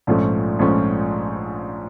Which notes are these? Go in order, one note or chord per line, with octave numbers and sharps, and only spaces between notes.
A#1 G#2 F3 A3 C#4
A#1 G#2 F3 A3 C#4